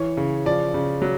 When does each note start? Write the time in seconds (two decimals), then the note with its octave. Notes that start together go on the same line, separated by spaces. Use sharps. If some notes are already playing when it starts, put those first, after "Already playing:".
Already playing: E3 C#5
0.17 C#3
0.46 F3 D5
0.74 C#3
1.02 F#3